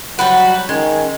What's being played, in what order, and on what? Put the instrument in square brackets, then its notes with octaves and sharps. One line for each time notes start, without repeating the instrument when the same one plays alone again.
[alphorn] F#3 [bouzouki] G3 F#4 B4 [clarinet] F#5
[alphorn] D#3 [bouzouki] G#3 [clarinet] C#4